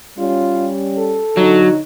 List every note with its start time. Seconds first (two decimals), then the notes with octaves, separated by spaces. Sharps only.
0.19 G3 C#4 F4
0.98 A4
1.37 D3 F#3 D#4